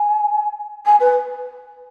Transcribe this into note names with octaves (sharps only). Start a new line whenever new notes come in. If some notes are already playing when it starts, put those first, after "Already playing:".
Already playing: G#5
G#5
B4